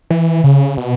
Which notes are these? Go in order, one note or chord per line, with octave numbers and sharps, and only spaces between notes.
E3
C#3
B2